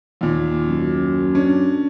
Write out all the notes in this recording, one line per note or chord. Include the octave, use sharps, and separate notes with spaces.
D#2 A#2
F#2
C#4 D4